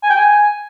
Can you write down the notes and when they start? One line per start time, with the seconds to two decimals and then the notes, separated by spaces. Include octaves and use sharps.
0.03 G#5
0.10 G5
0.17 G#5